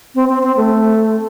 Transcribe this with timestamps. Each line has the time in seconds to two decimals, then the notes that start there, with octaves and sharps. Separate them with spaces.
0.15 C4
0.29 C4
0.43 C4
0.57 A3